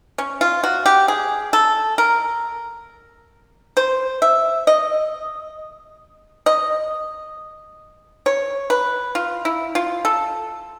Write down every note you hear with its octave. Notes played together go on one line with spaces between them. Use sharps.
C#4
F4
F#4
G4
G#4
A4
A#4
C5
E5
D#5
D#5
C#5
B4
F4
E4
F4
A4